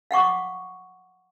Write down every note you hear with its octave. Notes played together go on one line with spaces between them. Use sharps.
F5 F#5 C#6 D6